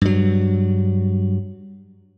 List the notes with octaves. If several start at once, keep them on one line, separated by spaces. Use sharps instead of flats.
G2 F#3